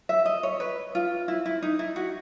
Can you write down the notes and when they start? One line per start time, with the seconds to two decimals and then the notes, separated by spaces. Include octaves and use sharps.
0.09 E5
0.26 D#5
0.43 C#5
0.60 B4
0.95 F4
1.28 E4
1.46 E4
1.62 D#4
1.79 E4
1.96 F#4